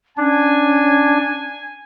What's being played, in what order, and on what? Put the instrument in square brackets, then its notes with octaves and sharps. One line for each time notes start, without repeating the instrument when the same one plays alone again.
[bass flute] C#4 [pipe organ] D4 [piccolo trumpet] G#5